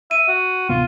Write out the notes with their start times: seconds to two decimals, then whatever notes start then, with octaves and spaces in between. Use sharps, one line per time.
0.11 E5 D#7
0.28 F#4
0.69 D1 C3 B3 F4